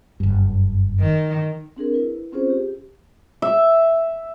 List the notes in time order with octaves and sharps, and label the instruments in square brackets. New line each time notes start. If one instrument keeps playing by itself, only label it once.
[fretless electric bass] F#1 G2
[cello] D#3
[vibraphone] C4 D4 G#4 A#4
E4 B4
C4 C#4 F4 G#4 C5
G4
[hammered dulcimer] E5